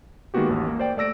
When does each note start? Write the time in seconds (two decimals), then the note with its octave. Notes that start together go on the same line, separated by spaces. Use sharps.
0.34 D#3 G#3 A#3 B3 F#4 G4
0.49 A1 D#2
0.67 A#3
0.79 C5 D5 G5
0.97 A3 D5 E6 A#6 D7